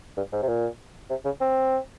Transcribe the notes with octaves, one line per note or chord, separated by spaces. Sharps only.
G2
G#2
C3
A#2
C3
C#3
C4